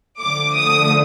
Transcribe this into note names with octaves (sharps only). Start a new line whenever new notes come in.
D3 F3 A3 D6
D#6